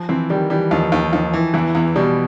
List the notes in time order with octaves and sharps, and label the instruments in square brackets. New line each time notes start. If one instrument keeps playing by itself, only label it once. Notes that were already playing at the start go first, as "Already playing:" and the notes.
Already playing: [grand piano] F3
[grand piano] E3 [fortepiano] C4
[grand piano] D#3 [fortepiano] G3
[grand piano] E3 [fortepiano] G3
[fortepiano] D#2 [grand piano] F3
[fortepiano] D#2
[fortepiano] D#2 [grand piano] F3
[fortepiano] E3
[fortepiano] E2 [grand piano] E3
[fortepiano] E2
[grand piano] B2 [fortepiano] G3